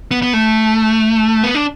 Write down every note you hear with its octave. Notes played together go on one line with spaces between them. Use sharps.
B3
B3
A3
B3
D4